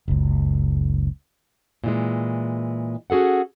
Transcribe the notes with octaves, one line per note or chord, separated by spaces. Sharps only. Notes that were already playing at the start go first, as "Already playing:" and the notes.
F#1 C#2
A#2 E3 G#3
C#4 F#4 G#4 A4 F#5